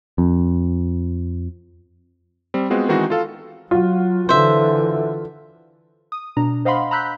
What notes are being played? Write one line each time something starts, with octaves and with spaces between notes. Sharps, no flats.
F2
G3 C4
G#3 B3 C4 F4 F#4
D#3 E3 G#3 C4 D#4 F#4
F4 A4 F5
F#3 F4 F#4
D3 E3 C5 E5
D#6
B2 D4 A#5
C5 D#5 F5 F#5 B5 C6
A#5 B5 E6 F#6 G6 B6